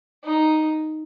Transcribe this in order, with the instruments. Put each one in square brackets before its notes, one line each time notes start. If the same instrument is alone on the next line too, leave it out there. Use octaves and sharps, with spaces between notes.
[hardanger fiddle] D#4